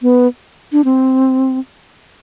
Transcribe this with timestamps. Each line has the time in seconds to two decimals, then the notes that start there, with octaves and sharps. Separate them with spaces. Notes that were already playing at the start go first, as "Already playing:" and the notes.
0.02 B3
0.72 D4
0.84 C4